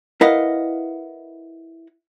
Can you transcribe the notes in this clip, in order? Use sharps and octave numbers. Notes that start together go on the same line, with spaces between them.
E4 A#4 B4 D#5 F5 F#5